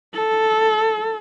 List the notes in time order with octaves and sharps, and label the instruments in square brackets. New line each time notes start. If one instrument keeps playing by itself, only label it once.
[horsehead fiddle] A4